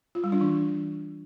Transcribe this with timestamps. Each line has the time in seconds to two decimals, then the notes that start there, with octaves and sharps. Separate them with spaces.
0.15 F4
0.24 G3
0.32 D4
0.41 E3